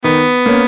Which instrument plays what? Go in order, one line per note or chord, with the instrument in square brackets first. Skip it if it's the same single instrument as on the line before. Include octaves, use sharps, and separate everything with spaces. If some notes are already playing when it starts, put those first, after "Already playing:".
[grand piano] D#3 [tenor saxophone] B3
[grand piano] A#3 C#4